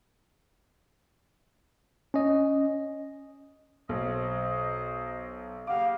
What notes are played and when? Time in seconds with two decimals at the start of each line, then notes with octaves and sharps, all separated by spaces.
2.14 C#4 D#5
3.89 B1 C5 D#5
5.67 C#3 A#3 G4 F5 F#5 D6